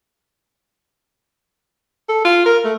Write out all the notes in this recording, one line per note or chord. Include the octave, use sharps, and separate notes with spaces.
A4
F4
A#4
A3